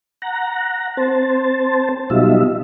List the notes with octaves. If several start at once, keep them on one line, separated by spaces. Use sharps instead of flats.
F#5 A#5
C4 C5 A5
B2 F#3 G3 D#4 F4 E5